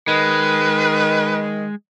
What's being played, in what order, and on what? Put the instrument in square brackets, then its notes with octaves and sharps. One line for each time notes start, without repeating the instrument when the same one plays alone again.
[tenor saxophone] D#3 [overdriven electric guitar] G#3 [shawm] B4